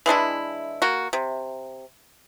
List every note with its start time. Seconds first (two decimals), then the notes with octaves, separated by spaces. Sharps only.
0.06 E3 G#3 D4 E4
0.82 A#3 F#4
1.13 C3